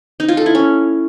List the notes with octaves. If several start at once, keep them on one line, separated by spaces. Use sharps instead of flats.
D#4
F4
A4
E4
C#4